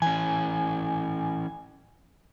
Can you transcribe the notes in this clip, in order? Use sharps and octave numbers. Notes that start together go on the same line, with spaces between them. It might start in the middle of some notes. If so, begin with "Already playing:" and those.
E3 C#4 G#5